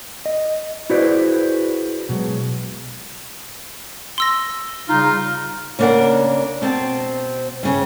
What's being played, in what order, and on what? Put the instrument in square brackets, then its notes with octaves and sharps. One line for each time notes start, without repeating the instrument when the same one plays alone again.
[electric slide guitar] D#5
E4 F#4 G#4 B4 C5 D5
B2 F#3 G#3
[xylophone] C6 E6 A#6
[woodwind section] C#3 G3 D#4 [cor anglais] F4
[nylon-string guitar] C#3 A#3 D4 A#4 F#5
B2 C4 A5
G2 C#3